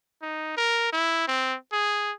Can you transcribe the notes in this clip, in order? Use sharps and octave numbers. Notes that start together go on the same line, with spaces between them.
D#4
A#4
E4
C4
G#4